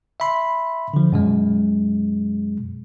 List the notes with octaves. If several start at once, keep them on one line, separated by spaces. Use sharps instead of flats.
E5 B5 C6
D3 F3
F#2 B2 G#3